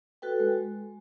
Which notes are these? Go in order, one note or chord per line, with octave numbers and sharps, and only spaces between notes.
F#4 A4 B4 G5
G#3